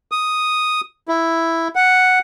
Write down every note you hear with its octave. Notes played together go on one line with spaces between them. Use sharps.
D#6
E4
F#5